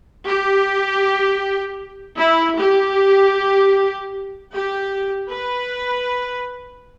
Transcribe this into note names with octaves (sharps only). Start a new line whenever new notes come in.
G4
E4
G4
G4
B4